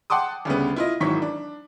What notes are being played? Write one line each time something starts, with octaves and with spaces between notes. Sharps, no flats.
F#5 G5 A5 C6 D6 D#6
D2 C#3 G3 B3
E4 F4 D#5
G#1 D#3 E3 F#3 C#6 B6
D4